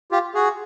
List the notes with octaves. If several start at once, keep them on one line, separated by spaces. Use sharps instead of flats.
F4 G4
F#4 G#4